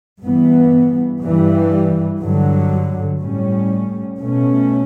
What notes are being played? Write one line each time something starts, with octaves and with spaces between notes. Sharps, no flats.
G2 E3 B3
G2 E3 G3
G2 D3 F#3
A2 G3 C#4
B2 A3 C#4